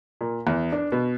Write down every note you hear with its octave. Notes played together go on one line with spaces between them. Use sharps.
A#2
E2
D4
B2